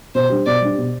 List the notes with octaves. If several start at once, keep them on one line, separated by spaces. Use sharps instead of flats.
B2 C5
G3 D4 G4
B2 D5
G3 D4 G4
B2